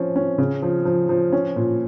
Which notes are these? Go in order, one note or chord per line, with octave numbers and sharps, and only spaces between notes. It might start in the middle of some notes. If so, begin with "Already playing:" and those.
Already playing: F3 C#4
C#4
C#3
F3
F3
F3
C#4
A#2